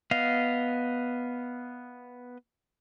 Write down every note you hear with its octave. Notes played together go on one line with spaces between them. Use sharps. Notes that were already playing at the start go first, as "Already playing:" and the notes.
B3 D#5 F5